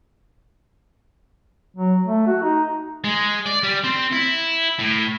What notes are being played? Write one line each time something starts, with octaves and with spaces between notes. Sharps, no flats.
F#3
A3
F#4
D#4
G#3
D5
G3
C4
E4
A2